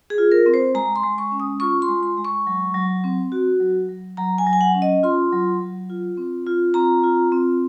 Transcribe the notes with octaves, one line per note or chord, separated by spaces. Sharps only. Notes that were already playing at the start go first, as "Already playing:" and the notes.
G#4
F4
A#4
C4
C5
G#3 A#5
C6
G#3
C#6
C#4
D#6
F4 C#6
C6
G#3
C6
G#3
C#6
F#3
F#3
C4
F#4
F#3
F#3
F#3 A#5
G#5
F#3
G#5
F#5
C#4
D#5
F4 C6
F#3
F#3
F4
C4
F4
C4 A#5
F4
C4